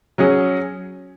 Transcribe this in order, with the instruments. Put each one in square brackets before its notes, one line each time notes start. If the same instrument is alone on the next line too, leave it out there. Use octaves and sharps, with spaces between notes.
[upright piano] F#3 C#4 G#4